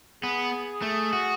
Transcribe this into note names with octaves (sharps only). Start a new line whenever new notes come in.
B3 G#4
A3
F#4